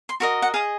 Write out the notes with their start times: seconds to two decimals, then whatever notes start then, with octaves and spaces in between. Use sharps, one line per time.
0.09 C6
0.20 F#4 A#4 D#5 C#6
0.42 F#5
0.54 G#4 D#5 F5